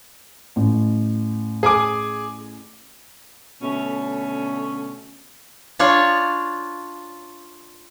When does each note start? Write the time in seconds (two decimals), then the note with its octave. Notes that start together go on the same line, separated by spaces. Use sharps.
0.56 A1
1.63 G#4 G#5 D6
3.62 B2 D3 A3 C#4
5.79 D4 F4 C#5